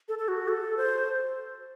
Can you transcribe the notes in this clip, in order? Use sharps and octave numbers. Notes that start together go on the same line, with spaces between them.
A4
A4
F#4
A4
C5